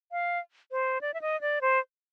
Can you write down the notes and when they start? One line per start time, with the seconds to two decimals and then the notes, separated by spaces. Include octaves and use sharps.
0.12 F5
0.71 C5
1.01 D5
1.14 E5
1.22 D#5
1.41 D5
1.61 C5